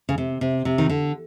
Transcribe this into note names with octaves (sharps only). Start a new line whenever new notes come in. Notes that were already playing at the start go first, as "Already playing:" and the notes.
C#3
C3
C3
C3
D#3
D3